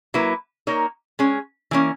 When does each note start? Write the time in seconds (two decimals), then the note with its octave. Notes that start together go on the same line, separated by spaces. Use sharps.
0.14 F#3 A#3 E4 B4
0.67 A#3 D#4 A#4 C#5
1.19 G#3 C#4 G#4
1.71 E3 A#3 C#4